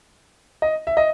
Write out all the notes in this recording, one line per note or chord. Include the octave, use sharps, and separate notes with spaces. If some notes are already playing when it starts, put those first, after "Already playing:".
D#5
E5
D#5